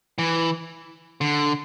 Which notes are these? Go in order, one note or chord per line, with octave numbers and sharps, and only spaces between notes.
E3
D3